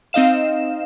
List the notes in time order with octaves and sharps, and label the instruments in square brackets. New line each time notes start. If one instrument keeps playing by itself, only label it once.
[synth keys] C4 D#4 D#5 F5 E7